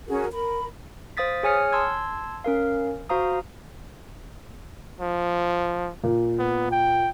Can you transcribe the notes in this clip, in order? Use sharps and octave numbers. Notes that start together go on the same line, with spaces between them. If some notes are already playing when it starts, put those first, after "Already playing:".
C#4 F#4 G#4 A#4
A#4 B5
C5 F5 D#6 A6 B6
G#4 C#5 G#5 D#6 F6 C#7
A5 C6 E6 G#6
C#4 A#4 F5
F#4 C5 F5 A#5 D#6
F3
A#2
B3
G5